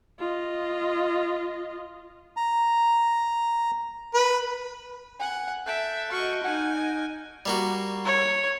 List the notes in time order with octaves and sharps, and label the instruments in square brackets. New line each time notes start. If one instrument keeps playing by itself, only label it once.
[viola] F4 D#5
[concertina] A#5
[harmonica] B4
[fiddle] F#5 [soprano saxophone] G#5
[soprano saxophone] A4 [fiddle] E5 [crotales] F#6 G6 D7
[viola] F#4 D#5 [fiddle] C#6 [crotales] F6
[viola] D#4 [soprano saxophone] F#5 [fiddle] G#5
[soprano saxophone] D#5
[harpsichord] G3 A#3 F#4
[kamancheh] C#5